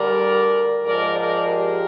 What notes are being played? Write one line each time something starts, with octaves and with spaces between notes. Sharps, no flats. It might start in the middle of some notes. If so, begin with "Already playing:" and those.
Already playing: D2 D3 G3 A#4 D5
G#2 F3 G#3 A#4 D5
A#4 D5
G4 A#4